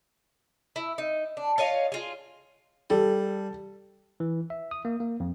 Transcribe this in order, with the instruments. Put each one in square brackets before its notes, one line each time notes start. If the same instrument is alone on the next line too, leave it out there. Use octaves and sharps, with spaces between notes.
[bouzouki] E4
D#4
D4
F4 C#5 D#5 F5
F4 G#4
[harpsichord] G3 [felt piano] G4 A4
[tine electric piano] E3
E5
D#6
A#3
A#3
F2